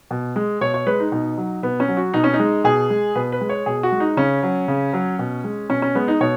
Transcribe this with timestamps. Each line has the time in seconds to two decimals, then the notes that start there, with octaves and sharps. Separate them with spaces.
0.11 B2
0.36 G#3
0.61 B2 C#5
0.74 C#5
0.86 G#3 B4
1.00 D#4
1.12 B2 D#4
1.38 F#3
1.63 B2 B3
1.80 C#4
1.88 F#3
1.97 F#4
2.14 B2 D#4
2.24 C#4
2.34 D#4
2.39 G#3
2.64 B2 G#4
2.90 G#3
3.15 B2 B4
3.32 B4
3.41 G#3
3.49 C#5
3.66 B2 G#4
3.83 F#4
3.92 G#3
4.00 D#4
4.17 C#3 C#4
4.43 F#3
4.68 C#3
4.93 F#3
5.19 B2
5.44 G#3
5.70 B2 C#4
5.82 C#4
5.95 G#3 B3
6.08 D#4
6.21 B2 C#5